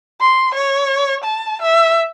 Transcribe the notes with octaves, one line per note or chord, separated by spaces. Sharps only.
C6
C#5
A5
E5